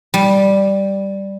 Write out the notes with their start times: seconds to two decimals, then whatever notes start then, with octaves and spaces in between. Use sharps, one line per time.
0.14 G3